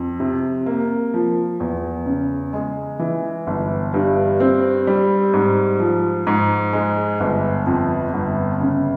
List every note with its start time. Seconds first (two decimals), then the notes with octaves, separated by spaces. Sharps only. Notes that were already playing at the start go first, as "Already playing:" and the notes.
Already playing: F2
0.20 C3
0.66 A#3
1.14 F3
1.60 E2
2.06 C#3
2.53 G#3
2.99 E3
3.47 G1
3.94 G2
4.40 C4
4.87 G3
5.33 G#2
5.80 F3
6.27 G#2
6.73 G#3
7.20 G1
7.67 F2
8.14 G1
8.60 C#3